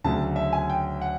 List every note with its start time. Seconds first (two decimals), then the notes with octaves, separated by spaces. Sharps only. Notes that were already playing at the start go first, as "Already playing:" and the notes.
0.04 D2 C#3 F#3 A3 A5
0.36 E5
0.53 G#5
0.70 G5
1.02 F#5